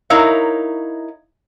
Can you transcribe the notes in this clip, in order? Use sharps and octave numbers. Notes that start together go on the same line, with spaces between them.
D#4 E4 A#4 C#5 F5